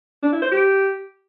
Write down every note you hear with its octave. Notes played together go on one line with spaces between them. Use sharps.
D4
E4
C5
G4